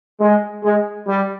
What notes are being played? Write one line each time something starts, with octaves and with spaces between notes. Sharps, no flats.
G#3
G#3
G3